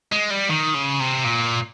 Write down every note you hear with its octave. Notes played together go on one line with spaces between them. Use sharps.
G#3
G3
D#3
C#3
C3
A#2